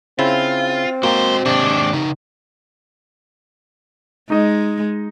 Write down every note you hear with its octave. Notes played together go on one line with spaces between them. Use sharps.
C#3 C4 E4 F4
A#3 F#4 C5 D#5 G5
D#2 G#2 C3 D4
C#3 D#4
G#3 D#4 D#5